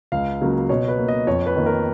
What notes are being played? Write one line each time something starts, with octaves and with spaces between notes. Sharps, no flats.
C#2 F5
C#3 F#3 A#3
B2 C#5
B4
A#3
D#5
F2 C#5
B4
D#3 A#3
A#4